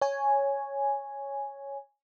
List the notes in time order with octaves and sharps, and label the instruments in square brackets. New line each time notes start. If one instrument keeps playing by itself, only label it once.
[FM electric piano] C#5 G#5